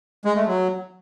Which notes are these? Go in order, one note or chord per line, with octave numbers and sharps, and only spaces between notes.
G#3
A3
F#3